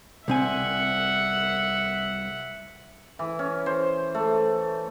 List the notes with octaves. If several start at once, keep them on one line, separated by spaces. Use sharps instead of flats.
C2 C4 E5 F#5 G#5
E3
C#4
C5
A3